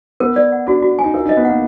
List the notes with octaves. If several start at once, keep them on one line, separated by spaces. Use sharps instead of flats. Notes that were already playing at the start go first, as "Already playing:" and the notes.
B3 A#4
D5
F#5
D4 F#4
F#4
G#5
D#4
F4 A#4
D#4
D#5
B3
A#3 F#5